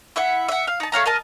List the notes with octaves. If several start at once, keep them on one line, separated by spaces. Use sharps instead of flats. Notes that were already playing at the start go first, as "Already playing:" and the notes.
E4 E5 F#5
E5 F#5
F5
D#4 A5
A3 C#5 F5 A#5
A#4 D#5 A5